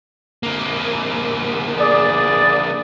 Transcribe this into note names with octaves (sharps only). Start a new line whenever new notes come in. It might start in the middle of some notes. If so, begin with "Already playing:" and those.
D3 A#3
G#4 D5